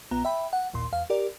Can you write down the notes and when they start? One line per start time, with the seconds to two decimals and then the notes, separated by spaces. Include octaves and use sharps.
0.11 A#1 B3 A#5
0.25 E5 G5 B5
0.53 F#5
0.73 A1 D#2 A#2 C6
0.92 E2 F5
1.10 G4 A#4 D5